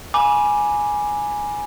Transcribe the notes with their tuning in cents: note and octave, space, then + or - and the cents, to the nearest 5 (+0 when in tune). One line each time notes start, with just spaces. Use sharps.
G#5 +0 B5 -30 D6 +0